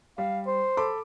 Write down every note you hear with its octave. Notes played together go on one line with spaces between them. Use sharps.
G3 F5
C5
A4 B5 D6